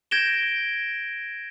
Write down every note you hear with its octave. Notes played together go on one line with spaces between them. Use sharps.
G6 G#6 A#6 D7 E7 G7